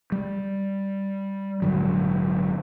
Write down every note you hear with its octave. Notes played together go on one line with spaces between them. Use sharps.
G3
A#1 G#2 D3 F#3